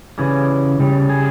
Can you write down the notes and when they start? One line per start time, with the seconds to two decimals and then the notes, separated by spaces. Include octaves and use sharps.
0.18 C#3 E3 G3 G#4
0.79 C#3 G3
1.09 G#4